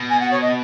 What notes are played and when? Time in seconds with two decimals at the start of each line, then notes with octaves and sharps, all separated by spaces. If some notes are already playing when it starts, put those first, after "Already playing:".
Already playing: B2
0.10 G#5
0.21 F#5
0.31 C#5
0.42 D#5